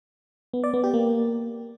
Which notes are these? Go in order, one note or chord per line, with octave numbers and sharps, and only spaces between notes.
B3
D5
B3
G4
A#3